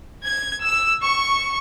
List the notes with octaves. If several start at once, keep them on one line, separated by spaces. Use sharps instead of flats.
G#6
E6
C#6